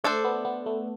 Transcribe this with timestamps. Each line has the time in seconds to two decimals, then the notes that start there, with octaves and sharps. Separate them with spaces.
0.04 A3 D4 A4 C5
0.24 B3
0.45 B3
0.66 A3